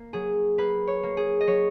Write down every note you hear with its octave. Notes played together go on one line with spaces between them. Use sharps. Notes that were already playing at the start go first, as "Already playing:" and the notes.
Already playing: A#3
F#3 G#4
A#3 B4
C#5
A#3
G#4
D#5
F#3 C#5